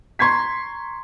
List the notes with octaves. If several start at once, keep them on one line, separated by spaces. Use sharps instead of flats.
A#5 C6 C#6 G#6 B6